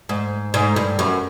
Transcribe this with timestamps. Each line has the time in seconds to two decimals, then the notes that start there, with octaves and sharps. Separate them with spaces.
0.09 G#2
0.54 G#2
0.76 G2
0.99 F#2